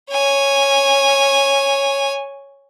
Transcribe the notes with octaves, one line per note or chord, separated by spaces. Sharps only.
C#5 G#5